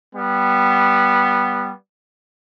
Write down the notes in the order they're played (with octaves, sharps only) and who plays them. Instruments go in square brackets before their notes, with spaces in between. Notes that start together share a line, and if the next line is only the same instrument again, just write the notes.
[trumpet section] G3 B3